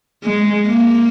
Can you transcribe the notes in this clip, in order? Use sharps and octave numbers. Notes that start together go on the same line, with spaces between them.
G#3
A#3